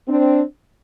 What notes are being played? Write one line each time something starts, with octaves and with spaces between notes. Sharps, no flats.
C4 D4